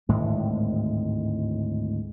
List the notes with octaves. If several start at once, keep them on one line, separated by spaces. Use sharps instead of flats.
G#1 D2 A2 G#3